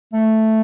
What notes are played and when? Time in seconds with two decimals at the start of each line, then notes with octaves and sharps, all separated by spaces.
0.14 A3